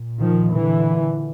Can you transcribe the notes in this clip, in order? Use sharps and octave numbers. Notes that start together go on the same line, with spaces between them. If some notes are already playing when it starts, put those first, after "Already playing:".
Already playing: A#2
D#3 F3
D3 E3